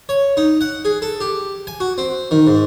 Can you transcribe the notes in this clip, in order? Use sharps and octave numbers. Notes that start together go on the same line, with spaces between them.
C#5
D#4
F#5
G#4
A4
G4
G#5
F#4
C4
D#3
G#2